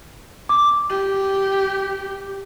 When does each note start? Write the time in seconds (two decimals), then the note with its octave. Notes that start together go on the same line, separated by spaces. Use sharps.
0.49 D6
0.90 G4